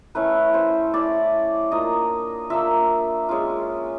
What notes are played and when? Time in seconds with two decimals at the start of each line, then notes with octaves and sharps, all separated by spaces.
0.15 A3 C#4 E4 B4
0.54 C5
0.93 A3 C#4 E4 D5
1.71 A#3 D4 F4 D#5
2.50 A#3 D4 F4 E5
3.29 G#3 C#4 F4